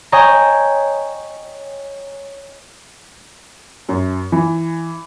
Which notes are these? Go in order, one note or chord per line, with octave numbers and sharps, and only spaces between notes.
C#5 D#5 G5 G#5 A#5
F#2
E3